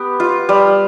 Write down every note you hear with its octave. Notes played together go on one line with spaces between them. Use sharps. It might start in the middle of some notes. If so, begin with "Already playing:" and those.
Already playing: B3 G4
F4
G3